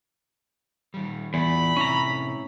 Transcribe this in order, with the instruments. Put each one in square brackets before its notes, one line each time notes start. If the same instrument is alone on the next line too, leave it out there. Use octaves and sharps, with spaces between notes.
[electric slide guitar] D#3 G3
[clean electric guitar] E2 [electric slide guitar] F4 D5 [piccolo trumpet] B5
[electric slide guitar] A2 C3 C4 [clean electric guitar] C#4 E4 A#5